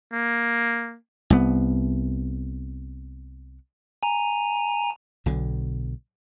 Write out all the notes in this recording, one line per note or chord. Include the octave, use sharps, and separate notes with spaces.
A#3
C2 B3
G#5 A#5
B1 B2 D3